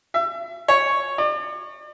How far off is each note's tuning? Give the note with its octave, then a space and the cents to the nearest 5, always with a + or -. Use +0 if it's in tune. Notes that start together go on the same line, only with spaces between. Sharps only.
E5 +35
C#5 -5
D5 +40